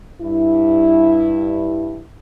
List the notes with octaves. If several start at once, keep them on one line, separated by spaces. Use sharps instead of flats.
G2 E4